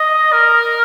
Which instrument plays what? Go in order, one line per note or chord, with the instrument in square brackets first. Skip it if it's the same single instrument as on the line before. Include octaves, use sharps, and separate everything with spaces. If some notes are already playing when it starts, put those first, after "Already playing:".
Already playing: [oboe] D#5
A#4